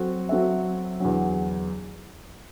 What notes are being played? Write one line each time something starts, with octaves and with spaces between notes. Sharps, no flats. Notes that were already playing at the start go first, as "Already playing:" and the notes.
Already playing: F#3 C4 F#4 A4
F#3 C4 F#4 A4 E5
E2 D3 F#3